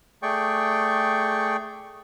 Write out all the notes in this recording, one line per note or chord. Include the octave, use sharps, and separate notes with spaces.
A3 G#4 D5 G5 C#6